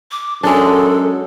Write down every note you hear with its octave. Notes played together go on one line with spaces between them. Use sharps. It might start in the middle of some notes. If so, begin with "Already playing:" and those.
D6
F#2 G#3 D4 A4